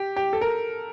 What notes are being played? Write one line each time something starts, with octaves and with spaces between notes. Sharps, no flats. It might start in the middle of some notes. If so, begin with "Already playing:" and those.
Already playing: G4
G4
A4
A#4